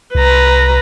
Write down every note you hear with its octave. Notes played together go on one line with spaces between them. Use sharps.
C2 B4 A#5